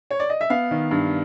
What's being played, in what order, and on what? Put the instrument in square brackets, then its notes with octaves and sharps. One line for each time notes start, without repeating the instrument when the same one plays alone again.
[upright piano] C#5
D5
D#5
E5
B3 F5
D#3
G2